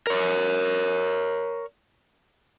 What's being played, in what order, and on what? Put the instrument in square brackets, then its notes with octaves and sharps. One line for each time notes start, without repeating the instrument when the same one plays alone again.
[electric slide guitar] A#4 C#5